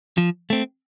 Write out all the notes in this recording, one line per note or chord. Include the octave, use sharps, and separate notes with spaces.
F3
A3 C4